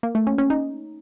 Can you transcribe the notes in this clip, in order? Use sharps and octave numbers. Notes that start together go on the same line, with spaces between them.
A#3
A3
C#4
C#4
D#4